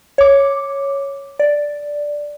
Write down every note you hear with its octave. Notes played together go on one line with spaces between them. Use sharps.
C#5 D6
D5